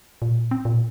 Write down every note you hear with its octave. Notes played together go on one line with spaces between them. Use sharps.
A#2
C4
A#2